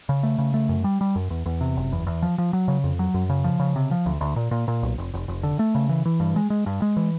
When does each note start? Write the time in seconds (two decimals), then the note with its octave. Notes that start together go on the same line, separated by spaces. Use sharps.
0.09 C#3
0.23 A3
0.38 C#3
0.54 A3
0.69 F#2
0.84 G3
1.01 G3
1.16 F#2
1.30 E2
1.46 E2
1.61 C3
1.77 F#1
1.92 E2
2.07 E2
2.22 F3
2.38 F3
2.53 F#3
2.68 C#3
2.84 F2
2.99 F#3
3.14 F#2
3.29 C#3
3.44 F3
3.60 C#3
3.76 C3
3.91 F3
4.06 D2
4.21 D2
4.36 A#2
4.51 A#2
4.68 A#2
4.83 B1
4.98 F1
5.14 F1
5.28 F1
5.43 D3
5.59 A3
5.75 C#3
5.89 E3
6.05 E3
6.20 G2
6.36 G#3
6.50 G#3
6.66 G2
6.82 G#3
6.97 E3